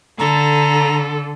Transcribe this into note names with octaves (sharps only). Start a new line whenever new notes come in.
D3 A4 A#5